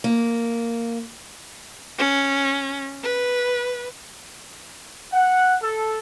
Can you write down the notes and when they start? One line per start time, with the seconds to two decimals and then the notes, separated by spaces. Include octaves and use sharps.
0.04 A#3
1.99 C#4
3.03 B4
5.12 F#5
5.60 A4